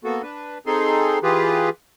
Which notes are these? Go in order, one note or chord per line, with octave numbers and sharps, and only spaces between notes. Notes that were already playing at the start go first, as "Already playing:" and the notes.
A#3 B3 F#4 A4
D4 B4
C4 D#4 G#4 A4 C6
E3 F4 G4 G#4 B4